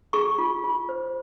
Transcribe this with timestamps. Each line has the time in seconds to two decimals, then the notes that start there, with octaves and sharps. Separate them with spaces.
0.13 G#4 C#6
0.38 F4
0.64 F4
0.89 C5